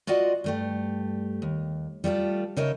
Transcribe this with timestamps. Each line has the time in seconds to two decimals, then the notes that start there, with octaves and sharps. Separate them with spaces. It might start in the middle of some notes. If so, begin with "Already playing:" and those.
0.07 F4 F#4 D5 D#5 F#5
0.44 G2 A3 G4
1.42 D#2
2.04 G3 A3 F4 A4
2.57 C#3 D#4 A#4 C#5 D#5 E5